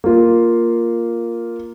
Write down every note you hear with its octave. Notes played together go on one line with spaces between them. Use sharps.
A#3 F4